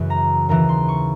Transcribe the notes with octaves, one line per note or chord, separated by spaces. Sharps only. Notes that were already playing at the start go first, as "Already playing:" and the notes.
Already playing: F#2 C#3 E3
A#5
D#2 C#3 E3 A#5
C6
C#6